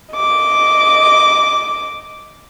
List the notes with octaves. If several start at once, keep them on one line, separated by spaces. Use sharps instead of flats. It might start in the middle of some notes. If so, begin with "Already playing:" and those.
D#5 D6